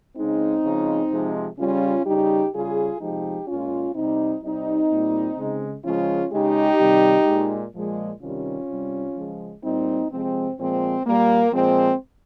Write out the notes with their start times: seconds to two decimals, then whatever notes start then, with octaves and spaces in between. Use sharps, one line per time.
0.17 C#3 G#3 C4 D#4
0.64 C#3 F3 G#3
1.11 C3 F3 G#3
1.58 C#3 G3 C#4 F4
2.06 C#3 G3 D#4 G4
2.53 C#3 G3 F4 G#4
3.01 C3 F3 G#3 D#4 G4
3.48 A#2 G#3 C#4 F4
3.95 C3 G3 C4 D#4
4.43 C3 G3 C4 D#4
4.90 A#2 G3
5.37 C#3 G#3
5.85 C#3 F3 G#3 C#4 F4
6.32 C#3 G#3 D#4 G4
6.79 C3 D#3 G3
7.27 A#2 G#3
7.75 A#2 F3 G#3
8.21 C3 D#3 G3 C#4 F4
8.69 C3 G3
9.16 C#3 F3 G#3
9.63 A#2 G3 C4 D#4
10.11 C3 F3 G#3 C4
10.59 A#2 F3 G#3 C4
11.06 A#2 G3 A#3
11.53 A#2 F3 G#3 C4